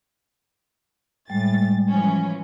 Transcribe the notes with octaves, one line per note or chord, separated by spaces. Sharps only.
A2 G3 G#3 A6
E3 F3 C#4